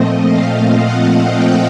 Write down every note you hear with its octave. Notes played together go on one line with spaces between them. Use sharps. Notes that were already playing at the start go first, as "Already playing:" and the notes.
Already playing: A#2 F3 A3 C4 D#5
F5
F#5
G5